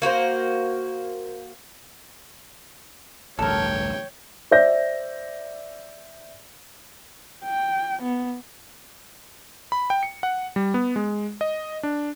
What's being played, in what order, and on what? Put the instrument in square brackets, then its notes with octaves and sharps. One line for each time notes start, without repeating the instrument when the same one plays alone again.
[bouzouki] A#3 F#4 G4 C5
[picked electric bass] A1 D2 G2 [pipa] A4 A#4 [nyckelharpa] C#5 G5
[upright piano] C5 D5 E5 G6 A#6
[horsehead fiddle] G5
B3
[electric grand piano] B5
G5
C#7
F#5
G3
B3
G#3
D#5
D4